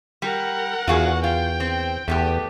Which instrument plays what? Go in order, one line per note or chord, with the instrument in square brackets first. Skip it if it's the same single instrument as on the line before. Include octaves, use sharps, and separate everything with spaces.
[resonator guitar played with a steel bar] G3 [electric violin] A#4 F#5
[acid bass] E2 [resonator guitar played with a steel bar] F4 F#4 G#4
[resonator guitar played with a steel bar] F4 [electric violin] G5
[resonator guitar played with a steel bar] C4
[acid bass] E2 [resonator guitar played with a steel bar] A3 B3 G4